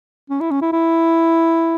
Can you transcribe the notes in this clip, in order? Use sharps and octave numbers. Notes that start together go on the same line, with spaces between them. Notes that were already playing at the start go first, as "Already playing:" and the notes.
C#4
E4
C#4
E4
E4